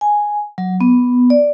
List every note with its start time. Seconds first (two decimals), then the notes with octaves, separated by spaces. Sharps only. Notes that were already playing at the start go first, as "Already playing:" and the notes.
0.01 G#5
0.58 F#3
0.81 B3
1.30 D5